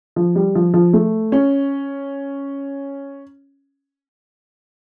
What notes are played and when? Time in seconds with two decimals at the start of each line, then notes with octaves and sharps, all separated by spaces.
0.16 F3
0.36 G3
0.55 F3
0.74 F3
0.93 A3
1.32 C#4